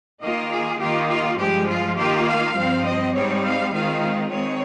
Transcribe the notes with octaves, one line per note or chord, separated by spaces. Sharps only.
D#3 A#3 F4 D#5
G#4
D#3 A#3 F4 G4
F4
G2 F3 G#3 G4
F4
D#3 A#3 F4 G4
F5
G2 F3 C4
D#5
G#2 G3 C4 D#4 C#5
F5
D#3 G#3 C4 F4 F5
D#3 G#3 C4 C#5